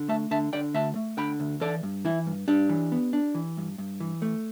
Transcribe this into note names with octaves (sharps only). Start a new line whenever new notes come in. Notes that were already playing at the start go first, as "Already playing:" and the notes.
Already playing: D3
A3 E5 A5
D3 E5 A5
D3 D5 G5
D2 E5 A5
A3
D3 G5 B5
D2
E3 A4 D5
G2
E3 E4
G2
G2 D4 G4
E3
B3
D4
E3
G2
G2
E3
A3